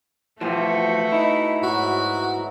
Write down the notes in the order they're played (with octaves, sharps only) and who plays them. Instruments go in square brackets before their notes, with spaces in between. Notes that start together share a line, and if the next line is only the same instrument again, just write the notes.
[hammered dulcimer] B2 G4 [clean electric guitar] E3 F3 [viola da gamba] A3 F#4
[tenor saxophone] D#4 [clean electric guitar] E4
[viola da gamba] G#2 [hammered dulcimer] F#3 [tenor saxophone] F#4